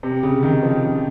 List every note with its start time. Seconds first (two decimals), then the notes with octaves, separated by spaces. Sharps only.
0.03 C3
0.23 C#3
0.43 D#3
0.63 F3
0.84 C#3